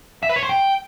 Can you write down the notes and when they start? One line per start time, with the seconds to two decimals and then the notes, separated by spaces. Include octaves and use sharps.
0.23 E5
0.29 B4
0.36 C#5
0.43 C5
0.49 G5